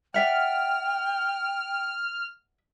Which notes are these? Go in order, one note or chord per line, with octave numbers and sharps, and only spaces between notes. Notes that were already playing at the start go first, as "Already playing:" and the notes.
D5 E5 F#5 G5 F6